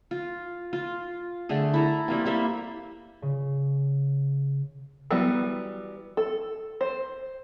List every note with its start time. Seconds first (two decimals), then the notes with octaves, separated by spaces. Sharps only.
0.11 F4
0.73 F4
1.49 D3 A3 G#4
1.74 E4 A4 A#5
2.08 G3 A#3 C4
2.25 G3 A#3 E5
3.22 C#3
5.11 E3 F#3 G3 B3
6.17 A4
6.81 C5